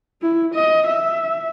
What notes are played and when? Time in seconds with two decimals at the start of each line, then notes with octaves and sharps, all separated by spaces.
0.21 E4
0.54 D#5
0.87 E5